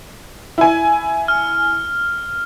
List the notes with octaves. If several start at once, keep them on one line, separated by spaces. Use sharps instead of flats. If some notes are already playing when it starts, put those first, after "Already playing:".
E4 G#5
F6